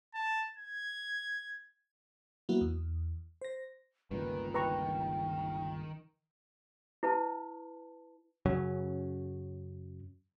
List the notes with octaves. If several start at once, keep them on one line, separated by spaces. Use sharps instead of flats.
A5
G#6
F#3 A#3 B3 E4 F#4
E2
C5 A#6
G1 C#2 A#2 D#3 B4
B4 G5 A#5 C#6
E4 B4 A5
F#2 C#3 F#3 C#4